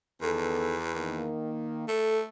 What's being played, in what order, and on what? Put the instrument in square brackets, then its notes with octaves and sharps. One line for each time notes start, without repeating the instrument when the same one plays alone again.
[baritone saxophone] E2 [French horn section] D#3 B3 A4
[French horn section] D#3 A#3
[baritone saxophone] A3 [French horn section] A4